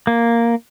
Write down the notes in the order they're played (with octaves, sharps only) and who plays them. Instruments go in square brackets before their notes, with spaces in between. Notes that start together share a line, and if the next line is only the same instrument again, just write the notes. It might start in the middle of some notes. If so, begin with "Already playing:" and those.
[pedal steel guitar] A#3